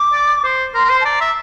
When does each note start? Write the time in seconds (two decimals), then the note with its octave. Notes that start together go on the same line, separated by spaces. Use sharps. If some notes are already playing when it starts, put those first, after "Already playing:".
Already playing: D6
0.13 D5
0.44 C5
0.75 A#4 C6
0.85 A#4
0.90 C5
1.01 A5
1.05 D5 A#5
1.21 E5